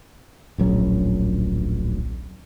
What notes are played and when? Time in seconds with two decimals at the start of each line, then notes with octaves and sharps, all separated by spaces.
0.58 D1 A#1 F#3 C#4